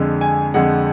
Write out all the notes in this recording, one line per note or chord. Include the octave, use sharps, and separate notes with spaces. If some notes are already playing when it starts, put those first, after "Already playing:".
Already playing: F2 D3 G#3
G#5
F2 D3 G#3 F#5